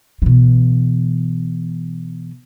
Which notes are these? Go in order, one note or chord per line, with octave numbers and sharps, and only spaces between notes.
B2 E3